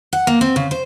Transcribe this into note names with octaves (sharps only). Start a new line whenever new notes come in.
F#5
A#3
C4
C#3
C5